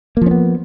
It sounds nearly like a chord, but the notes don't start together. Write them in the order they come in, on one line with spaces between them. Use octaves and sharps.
A#3 F3 C#4 B3